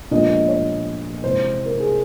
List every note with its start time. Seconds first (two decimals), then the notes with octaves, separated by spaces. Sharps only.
0.11 A#2 F3 G#3 B3 D4 D#5
0.30 D#5
0.48 C#5
1.23 C3 E3 G#3 C5
1.66 A#4
1.80 G#4